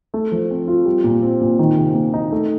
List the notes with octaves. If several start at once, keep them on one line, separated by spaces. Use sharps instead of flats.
A3
F3
C4
F4
G3
A#2
C4
A#2
D#3
C3
A#3
D#4
A3